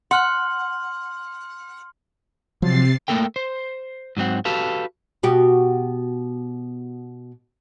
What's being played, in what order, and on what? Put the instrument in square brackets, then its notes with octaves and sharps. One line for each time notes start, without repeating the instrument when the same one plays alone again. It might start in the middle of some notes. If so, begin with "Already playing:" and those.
[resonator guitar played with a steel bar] F#5 [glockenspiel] C6 F6 F#7
[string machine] C3 A6 C7 [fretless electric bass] F3 F#3
[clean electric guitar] A3 A#3 A4 A#4 G5
C5
G#2 F#3 C4 F#5
F#4 G4 A4 B4 F5
[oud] B2 F#4 G4